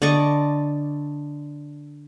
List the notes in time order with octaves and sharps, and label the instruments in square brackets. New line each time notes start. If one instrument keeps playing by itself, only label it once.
[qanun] D3 D5 D#5 C#6